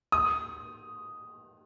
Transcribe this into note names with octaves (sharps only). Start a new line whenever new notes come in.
D#6